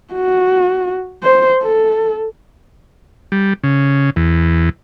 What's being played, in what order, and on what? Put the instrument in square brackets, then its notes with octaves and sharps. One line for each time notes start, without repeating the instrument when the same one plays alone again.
[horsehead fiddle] F#4
C5
A4
[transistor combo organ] G3
C#3
E2